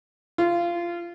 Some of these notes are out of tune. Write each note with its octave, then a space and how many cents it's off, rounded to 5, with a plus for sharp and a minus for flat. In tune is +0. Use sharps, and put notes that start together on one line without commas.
F4 -20